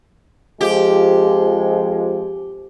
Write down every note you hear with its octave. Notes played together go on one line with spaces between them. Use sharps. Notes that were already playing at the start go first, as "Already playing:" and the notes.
F2 F3 G#3 G4